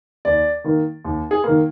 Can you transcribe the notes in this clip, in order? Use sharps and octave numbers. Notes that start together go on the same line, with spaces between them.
D#2 D5
D#3 A#3
D#2
G#4
D#3 A#3